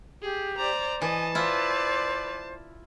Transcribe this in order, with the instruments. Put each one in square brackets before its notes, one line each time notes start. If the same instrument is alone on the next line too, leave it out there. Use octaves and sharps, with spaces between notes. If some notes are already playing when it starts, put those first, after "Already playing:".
[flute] G4 [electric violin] G#4
[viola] C5 D5 [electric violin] A#5
[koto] E3 [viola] D#5 [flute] G#5 [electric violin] A5
[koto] E4 F4 [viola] B4 D5 [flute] C5